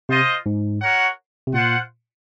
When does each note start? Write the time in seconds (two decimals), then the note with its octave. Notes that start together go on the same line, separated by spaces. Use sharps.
0.09 C3 F4 C5 D#5
0.46 G#2
0.81 F#4 A#4 C#5 F#5
1.47 C3
1.53 A#2 F4 C5 F#5